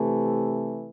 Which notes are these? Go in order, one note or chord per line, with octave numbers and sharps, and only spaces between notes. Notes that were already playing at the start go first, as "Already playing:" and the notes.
Already playing: C3 E3 A3